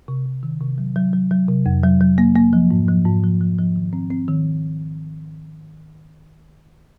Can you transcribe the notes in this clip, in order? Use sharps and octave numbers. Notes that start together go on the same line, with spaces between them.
C3
C3
D#3
C3
F#3
F#3
F#3
F#3
C3
F2
F#3
F#3
A#3
A#3
F3
G#2
F3
G#2
F3
F3
F3
D#3
C4
C4
D#3